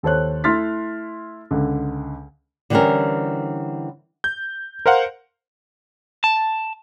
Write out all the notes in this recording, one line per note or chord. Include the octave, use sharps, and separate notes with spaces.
D#2 A4 C5 C#5 F#6
A3 E4 C6 F6 A6 B6
C#2 D3
D3 E3 G3 C4 C#4 A#4
G6
A#4 C5 F5 F#5
A5